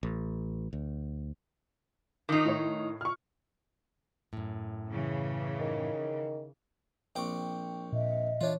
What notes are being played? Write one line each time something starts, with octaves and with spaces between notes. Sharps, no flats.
A1
D2
D#3 D#4 D6 C7
A2 C#5
C#6 F6
F#2 A2
C#3 E3
D#3
A#1 C4 G5 C#6 D6
A#2 D#5 E5
E3 D4 F4 C#5